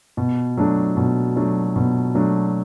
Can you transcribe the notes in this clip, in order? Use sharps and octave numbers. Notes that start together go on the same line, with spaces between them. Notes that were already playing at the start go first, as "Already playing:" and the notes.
B2
F#3 A3 D4
B2
F#3 A3 D4
B2
F#3 A3 D4